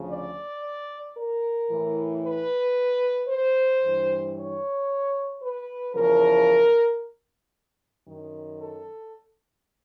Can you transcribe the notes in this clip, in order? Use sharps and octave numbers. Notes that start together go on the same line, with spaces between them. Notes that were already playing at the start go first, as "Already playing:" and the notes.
Already playing: D2 C#3 F3
D5
A#4
A2 E3
B4
C5
G2 E3
C#5
B4
E2 C#3 F3 A#4
F#2 D#3
A4